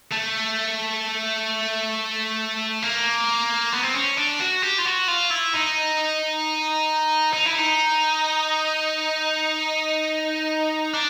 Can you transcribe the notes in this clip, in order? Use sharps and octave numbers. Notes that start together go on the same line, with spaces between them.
A3
A#3
B3
C4
C#4
D4
F#4
G4
F4
F#4
F4
E4
D#4
D#4
E4
D#4
D4